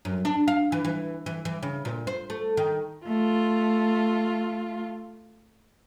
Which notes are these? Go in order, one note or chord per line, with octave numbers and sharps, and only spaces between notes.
F#2
D4
F5
E3
E3
E3
E3
C#3
A#2
C5
A3
D#3
A3 F4